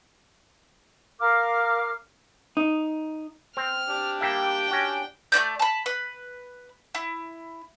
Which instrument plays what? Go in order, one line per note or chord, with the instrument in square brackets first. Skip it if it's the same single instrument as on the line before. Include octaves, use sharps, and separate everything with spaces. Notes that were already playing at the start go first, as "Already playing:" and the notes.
[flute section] A#4 F5 D6 F6
[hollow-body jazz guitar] D#4
[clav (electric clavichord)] C4 [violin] F6
[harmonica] D4 G4
[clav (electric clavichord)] G3 A#3 E5 [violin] G5
[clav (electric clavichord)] C#4 F#4
[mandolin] A3 C#4 D5 G6
A5 B5
B4
E4